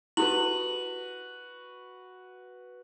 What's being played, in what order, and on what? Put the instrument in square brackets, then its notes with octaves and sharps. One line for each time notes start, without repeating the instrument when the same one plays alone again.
[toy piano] E4 G4 A4 [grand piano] F#4 B4 [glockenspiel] F#7